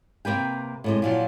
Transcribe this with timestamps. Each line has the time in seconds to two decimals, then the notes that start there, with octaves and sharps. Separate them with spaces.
0.25 C3 A#3 B4 G5
0.84 A2 C3 G#3
1.02 A#2 F3 F#3